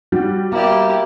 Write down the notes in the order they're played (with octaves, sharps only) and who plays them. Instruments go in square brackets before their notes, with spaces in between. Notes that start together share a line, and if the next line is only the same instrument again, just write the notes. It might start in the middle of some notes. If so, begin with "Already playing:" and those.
[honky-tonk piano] G3 [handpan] F#4
[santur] A#3 D5 [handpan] B3 [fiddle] E4 G4